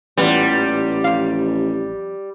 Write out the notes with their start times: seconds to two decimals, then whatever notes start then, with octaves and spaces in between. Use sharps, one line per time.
0.17 A1 A#2 E3 G3 B3
1.04 F2 F5